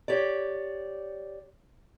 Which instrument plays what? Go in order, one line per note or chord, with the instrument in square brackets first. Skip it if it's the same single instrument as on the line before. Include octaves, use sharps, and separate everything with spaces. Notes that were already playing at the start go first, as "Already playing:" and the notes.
[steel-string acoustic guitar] G4 C#5 D5